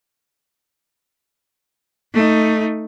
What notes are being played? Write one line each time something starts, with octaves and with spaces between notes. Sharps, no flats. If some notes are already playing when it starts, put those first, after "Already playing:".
A3 D#4